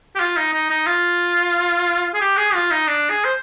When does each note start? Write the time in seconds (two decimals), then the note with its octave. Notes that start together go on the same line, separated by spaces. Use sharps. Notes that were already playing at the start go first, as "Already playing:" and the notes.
0.15 G4
0.19 F4
0.37 D#4
0.53 D#4
0.70 D#4
0.86 F4
2.14 G#4
2.21 G4
2.37 G#4
2.54 F4
2.71 D#4
2.88 D4
3.10 G#4
3.25 C5